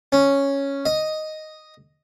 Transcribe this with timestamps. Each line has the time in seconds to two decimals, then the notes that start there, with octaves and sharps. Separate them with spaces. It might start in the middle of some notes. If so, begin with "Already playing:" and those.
0.12 C#4
0.86 D#5